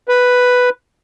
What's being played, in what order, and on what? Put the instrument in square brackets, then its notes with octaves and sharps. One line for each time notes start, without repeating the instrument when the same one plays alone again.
[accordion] B4